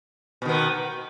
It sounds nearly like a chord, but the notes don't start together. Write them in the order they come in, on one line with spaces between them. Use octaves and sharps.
B2 D#3 B3